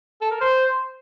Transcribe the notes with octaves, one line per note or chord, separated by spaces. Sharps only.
A4
A#4
C5